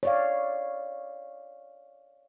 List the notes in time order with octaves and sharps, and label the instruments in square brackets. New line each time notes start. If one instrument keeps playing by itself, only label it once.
[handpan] C#5 D5 F5